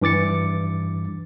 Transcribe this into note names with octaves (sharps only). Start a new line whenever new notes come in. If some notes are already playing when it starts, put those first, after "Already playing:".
G2 E3 D6 A6 C#7